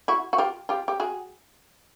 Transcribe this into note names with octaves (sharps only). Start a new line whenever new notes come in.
E4 F#4
F#4
F4 G4
F4 G4
G4
F#4 G#4